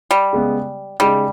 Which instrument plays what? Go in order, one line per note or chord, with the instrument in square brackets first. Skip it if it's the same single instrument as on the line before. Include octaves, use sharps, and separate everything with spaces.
[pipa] G3
[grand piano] C#3 G#3 B3
[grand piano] C#3 G#3 D#4 [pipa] G3